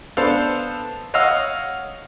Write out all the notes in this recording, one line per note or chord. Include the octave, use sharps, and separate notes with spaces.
B3 D4 A4 C5 F5
C#5 D#5 F5 F#5 E6 F6